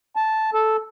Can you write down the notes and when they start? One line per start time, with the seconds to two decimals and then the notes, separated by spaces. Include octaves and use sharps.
0.16 A5
0.54 A4